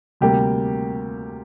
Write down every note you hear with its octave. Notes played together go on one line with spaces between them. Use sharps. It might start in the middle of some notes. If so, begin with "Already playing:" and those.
D2 C3 G3 A#3 G4